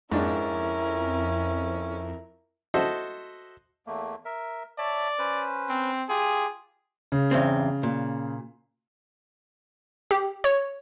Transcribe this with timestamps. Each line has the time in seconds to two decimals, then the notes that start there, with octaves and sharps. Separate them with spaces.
0.12 F2 G#2 C#4 D4 E4 A#4
2.74 F#4 A4 C5 D#5 E5
3.87 E2 A3 A#3
4.25 A#4 E5
4.78 C#5 D5 E5 A5
5.19 C#4 B4 C5
5.69 C4
6.09 F4 G4 G#4 G5
7.12 C#3
7.31 E2 G2 C4
7.83 A#2
10.11 G4
10.44 C#5